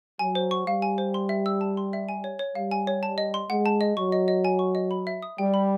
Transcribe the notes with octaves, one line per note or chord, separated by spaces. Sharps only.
F#3 G#5
C5
C#6
G3 F5
G#5
C5
C6
E5
E6
A5
C6
E5
G#5
C#5
C#5
G3 F5
G#5
C#5
A5
D#5
C6
G#3 F#5
A5
D#5
F#3 C#6
D#5
D#5
G#5
C#6
D#5
B5
E5
D#6
G3 G5
B5